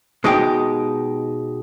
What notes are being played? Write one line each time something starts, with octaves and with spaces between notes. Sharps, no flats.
B2 G#3 D#4 G4